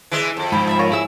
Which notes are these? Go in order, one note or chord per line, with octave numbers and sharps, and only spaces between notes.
E3 G#3
F2
G#2 F3 G5 B5
E5 A5 B5
F4 A#4 C#5
E4 G#4 E6